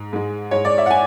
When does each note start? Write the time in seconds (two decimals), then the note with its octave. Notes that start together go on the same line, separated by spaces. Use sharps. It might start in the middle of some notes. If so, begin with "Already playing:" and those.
Already playing: G#2 G#3
0.13 G#2 G#3
0.51 G#2 G#3 C#5
0.65 D5
0.78 E5
0.86 F#5
0.90 G#5